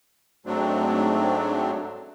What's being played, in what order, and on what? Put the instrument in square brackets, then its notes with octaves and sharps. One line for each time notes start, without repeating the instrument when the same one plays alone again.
[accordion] G#2 F#3 A3 C4 D4